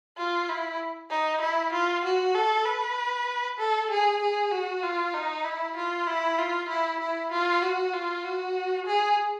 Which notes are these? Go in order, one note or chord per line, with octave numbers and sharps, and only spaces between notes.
F4
E4
D#4
E4
F4
F#4
A4
B4
A4
G#4
G#4
F#4
F4
D#4
E4
F4
E4
F4
E4
E4
F4
F#4
F4
F#4
G#4